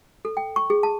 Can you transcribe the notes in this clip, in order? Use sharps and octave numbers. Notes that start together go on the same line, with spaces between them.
A4
G5
C#6
G#4
A5